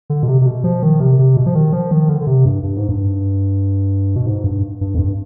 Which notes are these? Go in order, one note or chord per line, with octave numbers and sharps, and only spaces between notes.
D3
B2
C3
C3
B2
F3
D#3
C3
C3
B2
F3
D#3
F3
D#3
D3
D3
C3
G2
G2
G#2
G2
B2
G#2
G2
G2
F2
G2